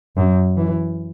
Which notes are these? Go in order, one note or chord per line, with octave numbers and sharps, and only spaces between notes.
F#2
E3